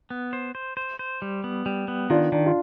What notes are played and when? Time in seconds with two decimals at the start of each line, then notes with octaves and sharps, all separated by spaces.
0.10 B3
0.33 C5
0.55 C5
0.77 C5
0.99 C5
1.22 G3
1.44 B3
1.66 G3
1.88 B3
2.10 D#3 D4 F4
2.32 D#3 D4
2.46 F4